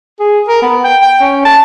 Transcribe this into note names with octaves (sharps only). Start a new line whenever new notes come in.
G#4
A#4
B3
G5
G5
C#4
A5